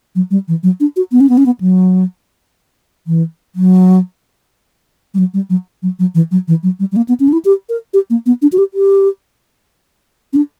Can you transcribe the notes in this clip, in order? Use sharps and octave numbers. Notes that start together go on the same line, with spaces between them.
F#3
G3
E3
F#3
D4
F#4
B3
C#4
B3
C#4
B3
F#3
E3
F#3
G3
F#3
G3
F#3
F#3
F#3
E3
F#3
E3
F#3
G3
G3
A#3
B3
C#4
D4
E4
G4
A#4
G4
A#3
B3
D4
F#4
G4
G4
C#4
D4